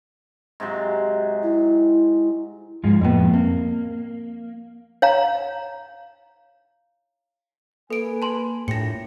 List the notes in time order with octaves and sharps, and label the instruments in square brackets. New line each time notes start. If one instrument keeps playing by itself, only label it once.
[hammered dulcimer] G#2 C3 F#3
[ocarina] E4
[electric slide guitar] G#2 F3 G#3
[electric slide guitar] F2 A2 B3 [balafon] F3 A#3
[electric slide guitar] A#3 [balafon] C4
[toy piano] C#5 F5 A#5
[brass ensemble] A#3 B4 G#5 [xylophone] A4 D7
[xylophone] A5 C6
[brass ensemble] A#1 G4 [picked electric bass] A2 [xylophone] A#6 C#7